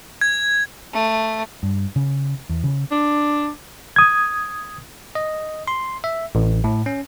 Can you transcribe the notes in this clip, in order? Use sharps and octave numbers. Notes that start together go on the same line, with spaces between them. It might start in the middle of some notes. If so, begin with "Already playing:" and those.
G#6
A3
G2
C#3
E2
C#3
D4
D#6 G#6
D#5
C6
E5
A1
A2
C#4